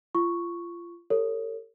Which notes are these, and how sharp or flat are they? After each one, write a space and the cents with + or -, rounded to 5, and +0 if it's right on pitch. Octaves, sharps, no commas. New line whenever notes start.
F4 -25 C#6 +0
G4 +45 A#4 -45 C#5 +0